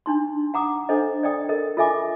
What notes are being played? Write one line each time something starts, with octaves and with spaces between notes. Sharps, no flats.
D4 D#4 C6
F#5 A#5 D6 D#6
D4 A4 C5 D#5
D5 D#5 G5 D#6
A4 A#4 D#5
F4 A4 D#5 E5 G#5 D6